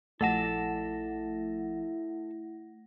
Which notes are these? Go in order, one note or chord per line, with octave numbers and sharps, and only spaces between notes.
A#1 F3 A3 E4 A4 F#5 A5 A#6